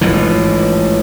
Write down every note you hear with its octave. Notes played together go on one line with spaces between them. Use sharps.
A1 G#2 E3 F3